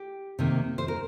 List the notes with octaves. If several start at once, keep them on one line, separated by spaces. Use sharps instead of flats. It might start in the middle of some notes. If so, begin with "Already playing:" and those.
Already playing: G4
C3 D#3 A#3
C5
A#4